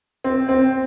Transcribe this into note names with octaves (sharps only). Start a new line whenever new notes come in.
C4
C4